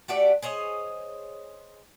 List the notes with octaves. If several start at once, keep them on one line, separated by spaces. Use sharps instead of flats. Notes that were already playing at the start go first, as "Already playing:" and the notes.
A3 F#4 G4 D5
G#4 C5 C#5 D#5